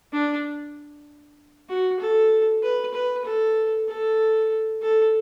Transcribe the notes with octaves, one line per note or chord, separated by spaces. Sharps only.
D4
F#4
A4
B4
B4
A4
A4
A4